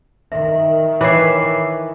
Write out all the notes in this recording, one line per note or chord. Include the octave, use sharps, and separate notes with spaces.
D#3 E5
E3 B4 C#5 E5 D6 C7